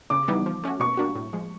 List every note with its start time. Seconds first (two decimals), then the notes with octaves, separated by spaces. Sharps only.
0.10 C#3 D6
0.28 E3 G3 B3 D#4
0.46 F3
0.64 A3 C#4 F#4
0.80 B2 C#6
0.97 G3 A#3 D4 F#4
1.15 A2
1.33 F3 G#3